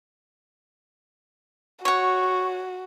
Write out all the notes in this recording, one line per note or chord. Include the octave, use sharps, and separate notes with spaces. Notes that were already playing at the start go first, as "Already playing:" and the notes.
F#4 C#5 F#5 C#6